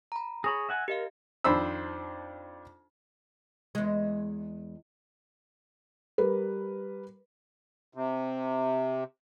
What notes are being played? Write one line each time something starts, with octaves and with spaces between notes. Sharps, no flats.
A#5 B5
G#4 C#5 B5 A#6
E5 F#5 G#5
G4 A#4 D#5 F5
F2 D#3 D4 C5 B5 E6
E2 G#3
G3 A#4 B4
C3